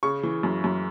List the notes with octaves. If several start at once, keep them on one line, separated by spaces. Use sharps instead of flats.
C#3 C#6
E3
F#2
F#2